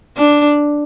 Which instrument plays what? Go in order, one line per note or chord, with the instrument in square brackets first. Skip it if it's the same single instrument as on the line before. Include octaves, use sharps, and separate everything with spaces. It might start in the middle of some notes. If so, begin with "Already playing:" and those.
[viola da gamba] D4